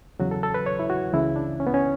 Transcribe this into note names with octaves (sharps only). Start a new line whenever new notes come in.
E2 C#3 F#3 F#4
A4
A4
B4
C#5
E4
F#4
C#2 C#3 E3 E4
D4
C#4
B3
C#4